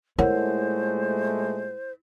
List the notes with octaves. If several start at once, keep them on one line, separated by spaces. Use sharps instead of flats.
A#2 G#3 A3 E4 A#4 C5 C#5 F#5